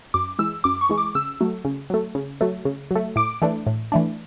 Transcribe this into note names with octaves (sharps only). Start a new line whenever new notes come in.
F#2 D6
E3 G#3 E6
F#2 D6
C#6
E3 G#3
D6
C#3 E6
F#3 A3
C#3
F#3 A3
C#3
F#3 A3
C#3
F#3 A3
A2 D6
E3 A3 D4
A2
E3 A3 D4